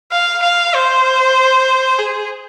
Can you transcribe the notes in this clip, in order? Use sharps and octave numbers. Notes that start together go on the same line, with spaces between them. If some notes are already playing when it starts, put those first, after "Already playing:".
F5
F5
C5
G#4